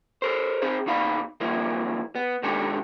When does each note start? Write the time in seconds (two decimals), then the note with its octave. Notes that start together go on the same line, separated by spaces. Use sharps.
0.22 A4 A#4 C5
0.62 C4 D#4 G#4 C5
0.86 D#2 B2 D#4 F5 B5
1.40 G2 D#3 F3 F#3 A#3 E4
2.15 B3
2.43 B2 D#3 G#3 D4 G4 A4